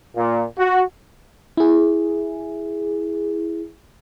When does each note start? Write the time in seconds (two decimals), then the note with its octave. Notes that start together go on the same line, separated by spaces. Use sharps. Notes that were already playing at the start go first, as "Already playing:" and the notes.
0.16 A#2
0.57 F#4
1.57 E4 G#4